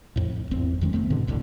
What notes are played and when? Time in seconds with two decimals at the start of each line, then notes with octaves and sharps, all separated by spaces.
0.16 F2 A2
0.51 G#1 E2 C4
0.81 F2 D#3 G#3 C#4
0.93 D#3 A3 B3 C4
1.10 G2 B2 D3
1.27 E1 C2 A2 D3